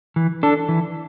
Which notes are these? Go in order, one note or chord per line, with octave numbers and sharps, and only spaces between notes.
E3
D4 A4
E3